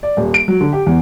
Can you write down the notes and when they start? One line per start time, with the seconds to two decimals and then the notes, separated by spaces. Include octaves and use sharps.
0.03 D5
0.17 D#1
0.34 D7
0.48 F#3
0.61 D3
0.73 G4
0.86 E2